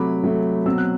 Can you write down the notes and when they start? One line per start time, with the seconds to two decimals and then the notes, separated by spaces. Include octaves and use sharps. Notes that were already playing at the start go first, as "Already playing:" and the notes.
Already playing: C3 F#3 A3 B5 D6
0.23 C3 F#3 A3
0.66 B2 F#3 C4 E6
0.78 F#6